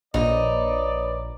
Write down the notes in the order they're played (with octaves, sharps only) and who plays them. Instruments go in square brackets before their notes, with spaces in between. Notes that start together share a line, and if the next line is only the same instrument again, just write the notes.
[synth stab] A#1 [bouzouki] D#4 [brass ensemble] B4 C#5 D5